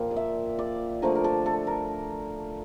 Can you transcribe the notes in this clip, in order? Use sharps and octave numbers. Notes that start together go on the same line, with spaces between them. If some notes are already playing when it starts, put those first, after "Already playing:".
Already playing: A#2 F3 A#3 G5
D5
E5
D5
D3 F3 A3 A#4
A#4
A4
A4
A#4